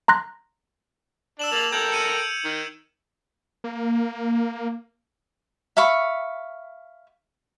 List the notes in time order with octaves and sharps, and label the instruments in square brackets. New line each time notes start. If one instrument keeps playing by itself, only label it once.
[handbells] A#5 C6 F#6 A#6
[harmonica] D4 [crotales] E6 E7 F#7
[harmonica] A#3 A5 [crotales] F7 F#7
[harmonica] A4 A#4 G5 [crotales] G6 G#6
[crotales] C#7 D#7 E7
D7
[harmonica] D#3
[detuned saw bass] A#3
[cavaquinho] E5 F5 B5 C#6